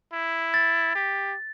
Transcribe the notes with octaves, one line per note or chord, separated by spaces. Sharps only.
E4
A6
G4